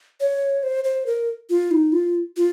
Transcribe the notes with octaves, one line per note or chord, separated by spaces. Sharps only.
C#5
C5
C5
A#4
F4
D#4
F4
F4